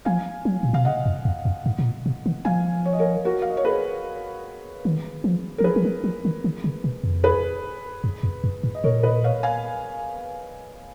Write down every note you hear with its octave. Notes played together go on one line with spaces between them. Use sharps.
F3 F5 G#5
F#3
A#2
B2 F5
C#3 D#5 F#5
F2
F2
F2
G#2
B2
A#2
B2
D#3
F3 F5 G#5
C#5
D#5
A#4 C#5
F#4 A#4
F5
D#5
C#5
G#4 B4
D#3
F3
D#3 A#4
F3 G#4 B4
F3
F#3
F3
D#3
D#3
C#3
B2
F2
G#4 B4
F#2
F2
F#2
G#2
D#5
A#2 A#4 C#5
B4 D#5
C#5 F5
F5 G#5